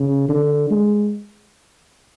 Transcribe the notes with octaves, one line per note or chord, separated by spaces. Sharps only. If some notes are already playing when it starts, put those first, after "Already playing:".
Already playing: C#3
D3
G#3